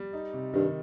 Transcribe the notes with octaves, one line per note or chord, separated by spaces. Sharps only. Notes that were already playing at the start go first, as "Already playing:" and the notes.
Already playing: G3
D#4
C3
G2 D#3